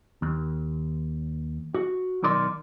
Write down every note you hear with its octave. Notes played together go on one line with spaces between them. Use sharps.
D#2
F#4
B1 D#3 A#4 D5 C6